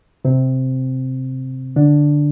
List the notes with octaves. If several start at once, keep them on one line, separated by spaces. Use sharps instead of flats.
C3 C4
D3 D4